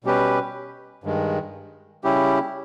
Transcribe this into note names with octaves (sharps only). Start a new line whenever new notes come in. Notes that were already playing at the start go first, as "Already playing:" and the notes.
B2 G3 C#4 G4 B4
G2 D#3 G#3
C#3 G3 C#4 E4 G4